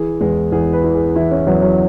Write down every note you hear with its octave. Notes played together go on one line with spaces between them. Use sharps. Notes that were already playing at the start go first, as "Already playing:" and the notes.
Already playing: E3 G#4
E2 G#3
E2 G#4
B4
E3
G#4
E3 E4
C#4
E2 F#3
F#3